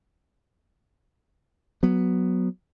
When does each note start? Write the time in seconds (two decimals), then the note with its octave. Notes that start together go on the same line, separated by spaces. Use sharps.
1.83 F#3 B3